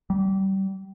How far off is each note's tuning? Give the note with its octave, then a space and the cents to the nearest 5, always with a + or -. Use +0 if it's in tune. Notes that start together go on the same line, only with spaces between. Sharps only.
G3 -25